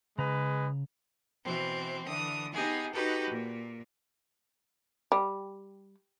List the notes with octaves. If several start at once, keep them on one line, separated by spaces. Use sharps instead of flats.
C#3 G#3 B4 A#5
B2 E3 C4
D3 E3 D#6
B3 D#4 G4 G#4
D#4 F#4 G4 A4 B4
A#2
G3